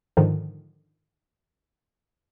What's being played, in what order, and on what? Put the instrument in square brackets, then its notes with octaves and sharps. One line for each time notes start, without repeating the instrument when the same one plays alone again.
[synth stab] G#2 D3 D#3 F3